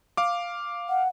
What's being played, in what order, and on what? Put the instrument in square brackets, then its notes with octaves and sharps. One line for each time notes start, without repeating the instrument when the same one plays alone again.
[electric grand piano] F5 D6
[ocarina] F#5